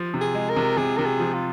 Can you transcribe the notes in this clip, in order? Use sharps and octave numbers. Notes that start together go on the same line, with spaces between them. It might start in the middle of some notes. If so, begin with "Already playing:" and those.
Already playing: F3
C3
G#4
G#3
A#4
C3
C3 G#4
C3 A#4
G#4
F3
F4